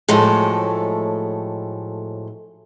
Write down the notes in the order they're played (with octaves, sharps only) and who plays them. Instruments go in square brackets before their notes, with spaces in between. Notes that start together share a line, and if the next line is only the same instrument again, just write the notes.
[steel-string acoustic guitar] A2 F3 F#3 G#3 A3